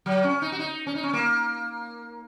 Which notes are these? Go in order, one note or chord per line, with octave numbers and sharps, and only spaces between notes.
F#3
C#4
D#4
F#4
D#4
C#4
D#4
C#4
A#3